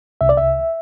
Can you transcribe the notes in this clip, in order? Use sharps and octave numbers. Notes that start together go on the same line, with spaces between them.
C2 E5
D5
E5